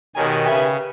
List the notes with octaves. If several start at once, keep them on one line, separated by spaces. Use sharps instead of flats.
B2 D#3 G4 A#4 C#5 G#5
C#3 G4 B4 E5 G#5